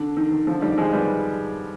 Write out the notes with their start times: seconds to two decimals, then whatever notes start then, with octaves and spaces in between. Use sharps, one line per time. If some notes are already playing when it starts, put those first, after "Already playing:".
Already playing: D3
0.17 D#3
0.32 D#3
0.47 D3 F3
0.62 D#3 G3
0.78 F3 G#3
0.93 G3 B3